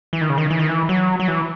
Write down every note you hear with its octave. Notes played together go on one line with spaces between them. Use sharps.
E3
D#3
C#3
D#3
E3
D#3
E3
F#3
F#3
E3